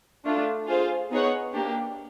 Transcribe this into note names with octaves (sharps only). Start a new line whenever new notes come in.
A3 D4 F4
F4 G#4 C5 F5
B3 D#4 G#4 C#5 F#5
A#3 D4 G4